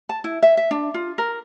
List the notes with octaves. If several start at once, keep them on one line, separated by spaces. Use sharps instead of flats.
A5
E4
E5
E5
D4
F4
A#4